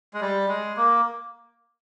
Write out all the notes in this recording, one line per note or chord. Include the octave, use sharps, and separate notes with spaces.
G#3
G3
G#3
A#3